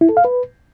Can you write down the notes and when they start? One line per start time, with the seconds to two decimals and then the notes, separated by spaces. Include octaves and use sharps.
0.01 E4
0.09 A4
0.17 F5
0.25 B4